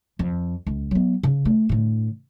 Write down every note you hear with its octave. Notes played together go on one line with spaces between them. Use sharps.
F2
C#2
F#3 B3
C#3
A3
A2 D3